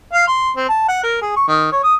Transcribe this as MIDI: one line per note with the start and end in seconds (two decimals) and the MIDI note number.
0.13 0.24 77
0.27 0.50 84
0.56 0.67 60
0.69 0.85 81
0.88 1.02 78
1.03 1.17 70
1.22 1.35 68
1.36 1.45 85
1.48 1.68 51
1.72 1.83 73
1.83 1.95 87